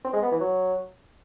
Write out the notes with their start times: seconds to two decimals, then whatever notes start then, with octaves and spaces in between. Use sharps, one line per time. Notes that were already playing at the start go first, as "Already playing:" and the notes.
0.05 C4
0.14 G#3
0.23 B3
0.32 E3
0.41 F#3